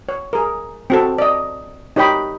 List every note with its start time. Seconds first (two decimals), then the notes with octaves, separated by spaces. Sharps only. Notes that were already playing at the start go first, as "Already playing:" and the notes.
0.09 C#5
0.33 G#4 A#4
0.90 C4 F#4 A4
1.18 D5 D#5
1.96 D#4 G4 C#5 D#5 G5 B5